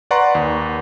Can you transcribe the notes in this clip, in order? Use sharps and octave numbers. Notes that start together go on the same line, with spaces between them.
B4 D5 F#5 A#5 C6 C#6
D#2